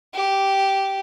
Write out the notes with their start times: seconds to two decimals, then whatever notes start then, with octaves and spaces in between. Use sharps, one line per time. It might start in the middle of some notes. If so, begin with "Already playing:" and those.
0.14 G4